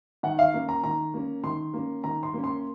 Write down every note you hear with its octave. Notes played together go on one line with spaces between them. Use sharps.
D#3 F#5
F5
A#3 C#4
A#5
D#3 A#5
A#3 C#4
D#3 C6
A#3 C#4
D#3 A#5
C6
A#3 C#4
C6